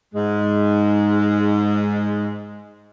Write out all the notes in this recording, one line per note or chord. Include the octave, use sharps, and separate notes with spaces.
G#2 G#3